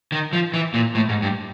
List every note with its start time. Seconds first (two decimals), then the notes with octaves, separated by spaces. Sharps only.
0.12 D#3
0.33 F3
0.54 E3
0.74 A#2
0.95 A2
1.09 G#2
1.22 G2